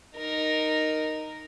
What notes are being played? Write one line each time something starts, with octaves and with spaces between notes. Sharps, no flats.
D#4 A#4